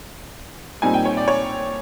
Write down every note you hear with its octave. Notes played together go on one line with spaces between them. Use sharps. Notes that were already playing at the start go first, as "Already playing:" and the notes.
A#2 G3 C4 D#4 G#5
G5
C#5
D5
C#5